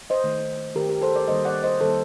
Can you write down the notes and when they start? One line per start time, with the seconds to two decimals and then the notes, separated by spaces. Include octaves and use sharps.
0.10 C5 D#5
0.24 D#3 A3
0.75 D#3 A3 G4 A#4
0.89 G4 A#4
1.01 A4 C5
1.15 A#4 D5
1.28 D#3 G3 A#3 C5 D#5
1.45 D5 F#5
1.63 C5 D#5
1.81 D#3 G3 A#3 A4 C5